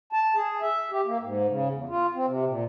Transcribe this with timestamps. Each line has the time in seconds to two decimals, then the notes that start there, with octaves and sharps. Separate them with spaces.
0.13 A5
0.36 G#4
0.61 E5
0.91 G4
1.06 A#3
1.21 G#2
1.48 C#3
1.71 E2
1.89 F4
2.14 C4
2.27 C3
2.47 A#2